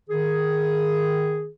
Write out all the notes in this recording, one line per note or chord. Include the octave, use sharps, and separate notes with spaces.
D#3 G#4